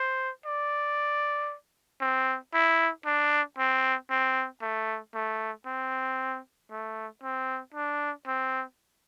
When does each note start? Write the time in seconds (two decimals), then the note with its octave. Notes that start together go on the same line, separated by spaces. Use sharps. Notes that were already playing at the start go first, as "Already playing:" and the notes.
Already playing: C5
0.46 D5
2.01 C4
2.54 E4
3.05 D4
3.59 C4
4.10 C4
4.62 A3
5.15 A3
5.66 C4
6.71 A3
7.23 C4
7.74 D4
8.27 C4